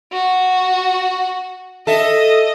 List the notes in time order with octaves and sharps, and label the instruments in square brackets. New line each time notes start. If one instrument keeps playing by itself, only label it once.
[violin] F#4
[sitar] A4 E5 [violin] D#5